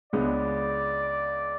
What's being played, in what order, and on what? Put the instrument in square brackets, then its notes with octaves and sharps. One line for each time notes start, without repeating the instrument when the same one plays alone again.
[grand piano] C#2 C#3 G#3 B3 D4 [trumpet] D5